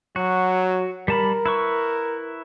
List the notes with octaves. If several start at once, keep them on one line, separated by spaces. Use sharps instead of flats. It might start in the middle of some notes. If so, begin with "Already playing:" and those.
F#3 F#4
G3 A#4 A5 B5
E4 B4 C#6